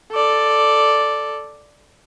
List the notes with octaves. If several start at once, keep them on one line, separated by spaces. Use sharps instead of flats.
A4 D5